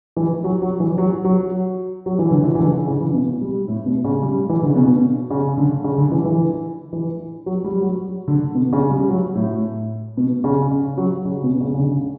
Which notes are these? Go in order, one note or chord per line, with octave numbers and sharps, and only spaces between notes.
E3
F#3
F#3
E3
F#3
F#3
F#3
E3
D3
E3
E3
D3
C#3
C#3
E3
B2
G3
A2
B2
C#3
G3
E3
D3
C#3
B2
C#3
D3
C#3
D3
E3
E3
E3
F#3
G3
F#3
D3
B2
C#3
G3
F#3
A2
B2
C#3
C#3
F#3
C#3
B2
C#3
C#3
D3